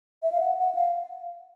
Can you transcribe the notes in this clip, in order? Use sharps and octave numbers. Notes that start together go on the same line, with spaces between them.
E5
F5
F#5
F#5
F5